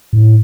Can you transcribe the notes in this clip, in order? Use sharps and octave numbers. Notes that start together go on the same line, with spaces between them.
A2